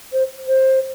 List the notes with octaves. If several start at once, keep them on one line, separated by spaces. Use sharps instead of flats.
C5
C5